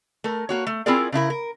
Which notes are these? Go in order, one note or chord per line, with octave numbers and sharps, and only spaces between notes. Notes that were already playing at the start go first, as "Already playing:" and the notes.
A3 A#4
A#3 F#4 C#5
A3
C4 E4 F4 G#4 A#4 D5
C#3 D4 E4 A#4
A#4